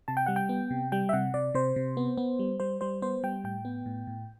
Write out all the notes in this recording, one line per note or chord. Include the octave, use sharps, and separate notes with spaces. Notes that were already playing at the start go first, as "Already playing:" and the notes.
C3 A5
G5
G3 F#5
G5
B3
C3
G3 G5
E5
C3 F#5
C3 D5
C3 C5
C3
B3
B3
G3
G3 C5
G3 C5
B3 C5
G3 G5
A2 G5
B3
A2
A2